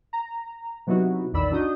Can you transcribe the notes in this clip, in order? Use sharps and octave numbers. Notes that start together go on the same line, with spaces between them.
A#5
C3 F#3 B3 D#4 E4 F#4
A#1 E2 D#3 D5 B5 E6
D4 D#4 F#4 D#6 G6